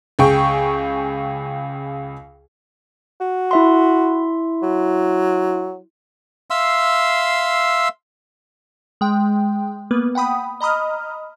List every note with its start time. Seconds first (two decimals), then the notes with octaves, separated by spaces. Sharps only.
0.19 C#2 G#4 G5 C#6
3.21 F#4
3.51 E4 E5 C6
4.63 F#3
6.50 E5 F5 C6 E6
9.01 G#3 G5
9.91 A#3 B3 B4
10.15 F#5 G5 B5 D#6
10.61 D#5 A#5 B5 D#6 F6